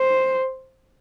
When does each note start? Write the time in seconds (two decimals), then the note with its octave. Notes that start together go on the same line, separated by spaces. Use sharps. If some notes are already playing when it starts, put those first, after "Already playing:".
Already playing: C5